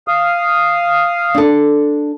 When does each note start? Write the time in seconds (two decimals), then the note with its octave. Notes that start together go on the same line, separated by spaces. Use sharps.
0.08 F5 D#6
1.34 D4 A4